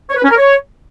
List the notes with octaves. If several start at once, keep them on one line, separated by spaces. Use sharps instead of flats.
C#5
B4
C#4
A#4
C#5